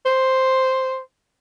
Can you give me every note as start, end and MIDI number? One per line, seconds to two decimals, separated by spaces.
0.05 0.98 72